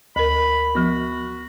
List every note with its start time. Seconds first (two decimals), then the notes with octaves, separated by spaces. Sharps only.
0.16 D2 A#4 B5
0.75 F3 B3 F#4